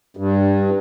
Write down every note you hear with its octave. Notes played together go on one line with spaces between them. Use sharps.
G2